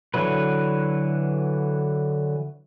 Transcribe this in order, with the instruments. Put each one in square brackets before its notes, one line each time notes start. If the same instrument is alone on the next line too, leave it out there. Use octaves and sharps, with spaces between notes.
[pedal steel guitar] D3 E3 F#3 B4